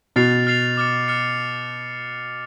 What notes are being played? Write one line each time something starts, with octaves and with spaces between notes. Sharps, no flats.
B2 F6 A6 C7 F7
F6 A6 C7 F7
D6 F6 A6 C#7
D6 F6 A6 C#7